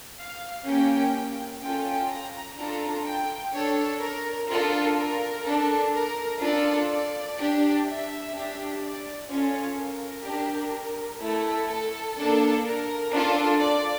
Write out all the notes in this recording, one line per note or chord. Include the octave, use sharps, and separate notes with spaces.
F5
A#3 C#4 G4 G5
C#4 F4 A4 G5
A#5
D4 F4 A4 A#5
G5
D4 A4 C#5
A#4
D4 F4 A4 A#4
A#4
D4 A4
A#4
D4 F4 A4 D5
D5
D4 G4
E5
D4 G4
D5
C#4 F4 A4 C#5
A#4
D4 G4
A3 E4 A4
A4
A#3 D4 A4
A#4
D4 F4 A4
D5